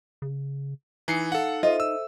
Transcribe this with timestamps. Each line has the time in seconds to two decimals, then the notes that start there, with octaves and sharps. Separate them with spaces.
0.22 C#3
1.08 E3 D#4 G#5 D#6 C7 C#7
1.32 A4 F5 F#5
1.63 F4 A4 C5 D#5 E5
1.80 E6